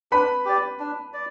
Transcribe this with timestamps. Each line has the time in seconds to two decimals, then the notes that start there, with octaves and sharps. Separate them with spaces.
0.12 D4 B4 B5
0.45 G4 D5
0.80 D4
1.14 D5